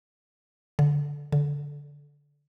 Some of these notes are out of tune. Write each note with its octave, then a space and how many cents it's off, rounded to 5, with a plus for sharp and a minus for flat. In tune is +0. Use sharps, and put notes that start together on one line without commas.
D3 -15
D3 -20